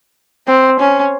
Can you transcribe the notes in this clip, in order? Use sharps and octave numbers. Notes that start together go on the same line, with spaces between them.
C4
C#4